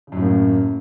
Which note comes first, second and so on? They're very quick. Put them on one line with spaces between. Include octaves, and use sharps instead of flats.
C#3 F#2 A2 A#3